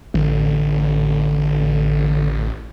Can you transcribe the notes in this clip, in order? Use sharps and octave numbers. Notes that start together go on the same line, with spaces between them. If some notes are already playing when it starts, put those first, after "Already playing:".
A1 D3